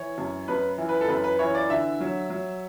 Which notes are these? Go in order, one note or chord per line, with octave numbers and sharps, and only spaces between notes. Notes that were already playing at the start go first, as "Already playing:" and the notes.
Already playing: E3 C#5
F#2
F#2 B4
E3
B4
A4
F#2 B4
B4
E3 C#5
D5
D3 E5
F#3
F#3